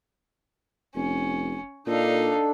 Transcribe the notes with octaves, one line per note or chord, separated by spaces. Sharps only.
F1 C#4
A#2 D4 D#4 A4 F5